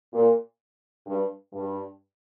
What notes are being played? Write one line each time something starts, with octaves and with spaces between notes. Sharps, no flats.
A#2
G2
G2